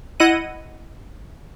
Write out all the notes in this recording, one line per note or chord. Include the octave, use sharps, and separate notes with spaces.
E4 D#5 F#5 F#6 D#7